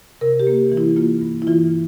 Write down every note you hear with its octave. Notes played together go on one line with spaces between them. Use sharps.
C3 A#4
G4
A#3
E3
E4
A#3 F4
G2
E4
E3 F4